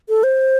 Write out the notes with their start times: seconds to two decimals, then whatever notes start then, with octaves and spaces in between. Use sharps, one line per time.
0.09 A4
0.23 C5